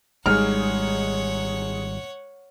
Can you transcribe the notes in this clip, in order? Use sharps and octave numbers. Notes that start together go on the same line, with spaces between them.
G#1 G3 G#3 D#4 G#4 C#5 F#5 F6